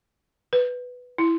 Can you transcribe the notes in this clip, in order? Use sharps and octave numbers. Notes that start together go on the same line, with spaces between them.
B4
E4